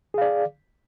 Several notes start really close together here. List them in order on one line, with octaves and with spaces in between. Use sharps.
G#4 F5 D5